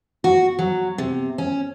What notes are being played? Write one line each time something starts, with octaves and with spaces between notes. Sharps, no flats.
F#4
F#3
C3
C#4